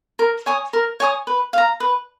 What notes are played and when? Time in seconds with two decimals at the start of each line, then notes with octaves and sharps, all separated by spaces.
0.19 A#4
0.46 C#5 G#5 D#6
0.73 A#4
1.00 C#5 G#5 D#6
1.27 B4
1.53 F5 A#5
1.80 B4